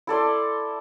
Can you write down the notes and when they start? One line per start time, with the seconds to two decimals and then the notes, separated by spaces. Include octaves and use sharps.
0.07 E4 A4 D5 C6